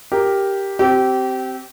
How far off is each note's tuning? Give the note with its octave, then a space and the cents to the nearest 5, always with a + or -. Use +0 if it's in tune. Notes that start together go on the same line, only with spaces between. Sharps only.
G4 +0 A#4 +0
C4 +0 G4 -25